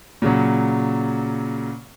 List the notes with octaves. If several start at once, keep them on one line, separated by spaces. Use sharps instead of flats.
A#2 C#3 F#3